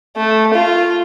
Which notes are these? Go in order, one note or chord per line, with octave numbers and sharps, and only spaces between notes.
A3
F4